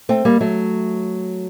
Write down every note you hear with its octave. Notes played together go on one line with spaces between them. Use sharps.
A3 C4
G3 A#3
F#3 A3